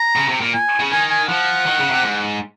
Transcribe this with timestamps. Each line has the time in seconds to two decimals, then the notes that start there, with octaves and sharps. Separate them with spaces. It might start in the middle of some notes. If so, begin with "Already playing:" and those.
Already playing: A#5
0.16 C#3
0.28 C3
0.41 A#2
0.54 G#5
0.80 C#3
0.91 D#3 G#5
1.10 G#5
1.29 F3 F#5
1.66 D#3
1.80 C#3
1.91 C3
2.04 G#2